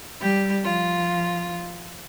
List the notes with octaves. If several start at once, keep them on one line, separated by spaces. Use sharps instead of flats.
G3 G4
F3 F4